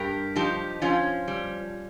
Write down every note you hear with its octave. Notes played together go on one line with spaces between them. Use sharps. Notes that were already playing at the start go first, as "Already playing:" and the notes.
Already playing: G2 G4 A#4
F3 D#4 G4
F3 C#4 F4
G3